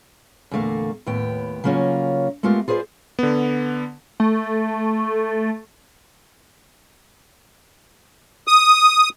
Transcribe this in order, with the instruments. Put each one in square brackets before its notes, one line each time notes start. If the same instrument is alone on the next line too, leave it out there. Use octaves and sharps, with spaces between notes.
[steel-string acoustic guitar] E2 A#2 D3 A3 A#3 F5
D#2 A2 B3 G5
C#3 F#3 A#3 C#4 F4 C#5
G#3 A3 B3 F4 G4 A#4
F4 G#4 B4 C5 D5
[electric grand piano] D3 B3
[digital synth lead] A3
[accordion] D#6